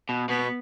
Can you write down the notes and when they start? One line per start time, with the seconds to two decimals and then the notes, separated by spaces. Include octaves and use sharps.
0.09 B2
0.29 B2 B3